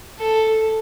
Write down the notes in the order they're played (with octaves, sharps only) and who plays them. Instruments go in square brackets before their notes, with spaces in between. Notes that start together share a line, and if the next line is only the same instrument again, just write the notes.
[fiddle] A4